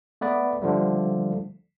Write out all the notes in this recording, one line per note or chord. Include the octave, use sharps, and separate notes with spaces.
A3 B3 B4 D5
D3 F3 G3 A3